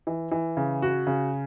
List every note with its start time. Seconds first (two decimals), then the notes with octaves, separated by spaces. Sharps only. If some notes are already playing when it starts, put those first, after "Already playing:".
0.07 E3
0.31 E3
0.57 C#3
0.82 F#4
1.07 C#3